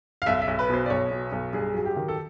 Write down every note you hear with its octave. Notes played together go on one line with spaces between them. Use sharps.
F5
B1 E5
E5
B1
B4
B2 C5
D5
B1 C#5
B2
B1
G2 G#4
F#3 G#4
G4
D#3
A4